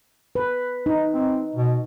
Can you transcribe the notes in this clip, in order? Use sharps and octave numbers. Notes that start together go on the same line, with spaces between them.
B4
D#4
C4
B2